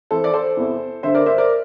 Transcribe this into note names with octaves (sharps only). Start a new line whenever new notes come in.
F2 E3 A4 C5
D5
A4 C5
E2 C3 E3
G2 D3 C5 E5
A#4 D5
C5 E5
A#4 D5